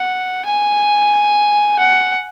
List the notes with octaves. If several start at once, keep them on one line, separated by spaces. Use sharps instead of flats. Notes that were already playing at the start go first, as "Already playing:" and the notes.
Already playing: F#5
G#5
F#5